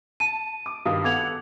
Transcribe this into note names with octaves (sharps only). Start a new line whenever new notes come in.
A5 D#7
D6
G2 D#3 G4 F5 D#6
B3 A4 F#5 D6 G#6 F7